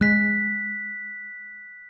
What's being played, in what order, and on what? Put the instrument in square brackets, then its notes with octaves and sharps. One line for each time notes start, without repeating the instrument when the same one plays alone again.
[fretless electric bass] G#3 [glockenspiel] F#6 B6